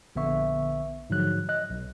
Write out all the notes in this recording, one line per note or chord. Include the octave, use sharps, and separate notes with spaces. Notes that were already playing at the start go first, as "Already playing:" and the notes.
A#1 D3 B3 E5 C#6
G#2 D3 F3 F#3 F#6
D#5 F#6
B1